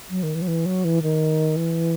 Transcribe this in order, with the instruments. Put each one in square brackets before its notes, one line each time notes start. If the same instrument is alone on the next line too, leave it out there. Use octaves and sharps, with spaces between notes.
[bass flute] F#3
D#3
E3
F#3
E3
F#3
E3
D#3
E3